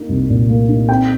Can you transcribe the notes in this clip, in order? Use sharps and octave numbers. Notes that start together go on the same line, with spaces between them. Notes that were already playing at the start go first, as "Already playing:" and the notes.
Already playing: A#3 D#4
C2
A#2
A#3
D#4
C4 G5